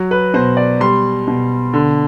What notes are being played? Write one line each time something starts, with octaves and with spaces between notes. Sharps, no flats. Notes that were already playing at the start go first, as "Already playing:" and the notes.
Already playing: F#3
B4
B2 C5
D5
G3 C6
B2
D3